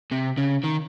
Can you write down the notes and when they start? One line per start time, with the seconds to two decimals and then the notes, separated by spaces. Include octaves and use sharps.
0.12 C3
0.38 C#3
0.64 D#3